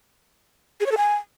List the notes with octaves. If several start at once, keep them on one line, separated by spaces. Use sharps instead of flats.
G#4
C#5
A4
G#5